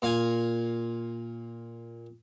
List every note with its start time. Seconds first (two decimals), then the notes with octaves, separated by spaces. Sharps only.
0.02 A#2 F5 G#5